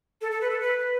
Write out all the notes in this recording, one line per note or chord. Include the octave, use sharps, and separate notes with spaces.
A4
A4
B4
A4
B4
B4